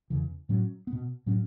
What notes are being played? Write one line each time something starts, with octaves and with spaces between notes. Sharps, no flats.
E2 C#3 E3
A2 F#3 C#4
B3
B2
A2 F#3 C#4